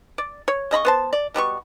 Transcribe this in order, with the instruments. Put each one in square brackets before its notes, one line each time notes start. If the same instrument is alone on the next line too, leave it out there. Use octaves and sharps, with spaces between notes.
[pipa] D5
C#5
C#3 D#5 B5 C#6
B3 C5 A5
D5
B2 G3 B3 C#6